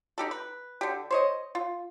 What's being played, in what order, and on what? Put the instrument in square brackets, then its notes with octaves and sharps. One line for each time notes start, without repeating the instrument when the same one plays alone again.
[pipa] D#4 G4 A4
B4
D3 G4
C5 C#5 D#5
F4